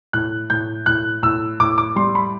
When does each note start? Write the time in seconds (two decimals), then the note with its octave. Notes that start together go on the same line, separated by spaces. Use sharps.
0.13 A2 F#6
0.50 A2 G6
0.86 A2 F#6
1.23 A2 E6
1.60 A2 D6
1.78 D6
1.96 G3 C6
2.15 B5